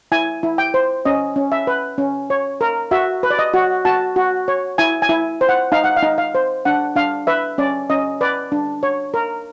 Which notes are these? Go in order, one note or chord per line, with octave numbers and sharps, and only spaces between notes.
E4 G#5
E4
G5
C5
C#4 D#5
C#4
E5
B4
C#4
C#5
A#4
F#4 E5
B4
D5
D#5
F#4
F#4 A5
F#4
C#5
E4 G#5
G#5
E4
C5
F#5
D#4 F5
F#5
F5
D#4
F5
C5
D4 F#5
D4 F5
B4 E5
C#4 D5
C#4 D#5
B4 D5
D4
C#5
A#4